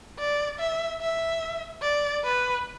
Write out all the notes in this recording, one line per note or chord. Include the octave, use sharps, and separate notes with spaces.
D5
E5
E5
D5
B4